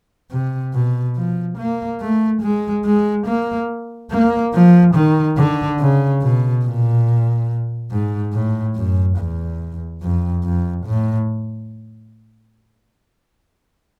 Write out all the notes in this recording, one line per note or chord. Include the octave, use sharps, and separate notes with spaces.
C3
B2
F3
A#3
A3
G#3
G#3
A#3
A#3
F3
D#3
D3
C#3
B2
A#2
G#2
A2
F#2
E2
F2
F2
A2